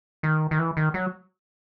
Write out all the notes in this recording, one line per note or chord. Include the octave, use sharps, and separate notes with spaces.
D#3
D#3
E3
D#3
F#3